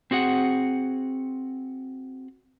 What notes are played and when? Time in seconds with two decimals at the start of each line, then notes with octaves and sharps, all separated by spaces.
0.11 C4 F#4 G#4 F#5